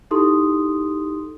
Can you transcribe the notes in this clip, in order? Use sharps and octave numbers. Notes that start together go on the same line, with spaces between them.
D#4 E4 G4 A4 C6 D#6